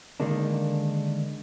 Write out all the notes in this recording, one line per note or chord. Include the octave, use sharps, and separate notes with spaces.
D3 D#3 G#3 A#3 D4